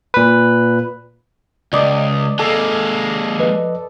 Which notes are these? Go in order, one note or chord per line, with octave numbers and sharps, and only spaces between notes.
A#2 B4
C#2 D5 D#5
G#3 A#3 A4
F3 B4 D#5